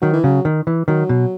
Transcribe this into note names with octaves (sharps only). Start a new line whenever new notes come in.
D#3 F#3
E3
C#3 F#3
D#3
E3
D#3 F#3
B2